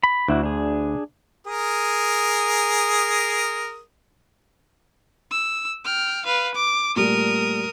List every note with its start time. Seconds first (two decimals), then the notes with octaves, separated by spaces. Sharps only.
0.04 B5
0.28 D2 D4 E4 F#4
0.43 D4 G#4
1.46 G#4 A#4 D#6
5.31 E6
5.85 G5 F6
6.26 B4 F5
6.55 D6
6.96 A#2 G3 A3 A#4 D#6